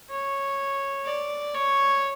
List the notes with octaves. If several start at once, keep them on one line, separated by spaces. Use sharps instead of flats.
C#5
D5
C#5